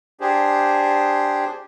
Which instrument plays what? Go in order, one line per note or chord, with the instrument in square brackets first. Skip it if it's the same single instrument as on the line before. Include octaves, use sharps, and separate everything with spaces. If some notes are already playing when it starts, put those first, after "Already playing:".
[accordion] D4 G4 G#4 C5